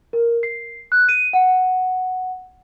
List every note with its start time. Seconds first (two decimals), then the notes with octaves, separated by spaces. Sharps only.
0.13 A#4
0.43 C7
0.92 F#6
1.09 D#7
1.33 F#5